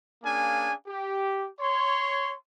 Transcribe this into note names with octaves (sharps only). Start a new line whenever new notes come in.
A#3 C#4 D4 G#4 F5 G#5
G4
C#5 C6